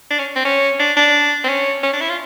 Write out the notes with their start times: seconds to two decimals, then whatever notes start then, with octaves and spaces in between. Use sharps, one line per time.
0.11 D4
0.19 C#4
0.36 C4
0.45 C#4
0.79 D4
0.97 D4
1.44 C4
1.49 C#4
1.83 C#4
1.93 D4
2.01 E4
2.10 F4